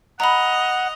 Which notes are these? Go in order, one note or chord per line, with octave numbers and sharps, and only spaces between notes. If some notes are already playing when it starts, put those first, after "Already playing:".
D#5 F#5 A#5 B5 F7